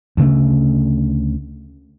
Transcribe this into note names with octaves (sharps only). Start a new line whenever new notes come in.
D2 C#3 A3